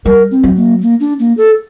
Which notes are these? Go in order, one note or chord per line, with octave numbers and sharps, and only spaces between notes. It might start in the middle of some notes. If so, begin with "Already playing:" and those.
G3 A#4
C4
F#3
A#3
A#3
D4
A#3
A4